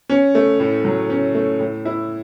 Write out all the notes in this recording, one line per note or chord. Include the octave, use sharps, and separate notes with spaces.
C#4
A3
A2
F#3
C#4
A3
A2
E4